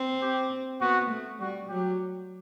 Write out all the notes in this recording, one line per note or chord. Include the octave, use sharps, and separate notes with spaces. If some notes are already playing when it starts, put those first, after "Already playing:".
Already playing: C4
G4
B3 F#4
A3
G3 F#4
F#3 G4